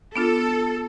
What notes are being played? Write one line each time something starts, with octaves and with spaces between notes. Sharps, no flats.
B3 D4 F4 A4